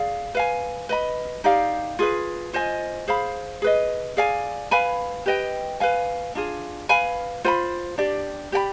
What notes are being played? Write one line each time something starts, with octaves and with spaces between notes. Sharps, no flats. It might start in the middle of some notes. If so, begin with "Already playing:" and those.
Already playing: G#4 D5 F5
B4 F5 G#5
B4 D#5 B5
D#4 G4 D5 F5
F4 G#4 B4
F4 C5 D#5 G#5
G#4 C5 F5 B5
G#4 B4 D#5
G#4 D5 F5 G#5
B4 F5 G#5 B5
G4 B4 D#5 G5
B4 F5 G#5
D4 F4 G#4
B4 F5 G#5 B5
F4 C5 G5 B5
D4 G4 D5
G4 D5 G5 B5